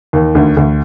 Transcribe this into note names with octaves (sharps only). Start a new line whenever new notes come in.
D#2
D2
D2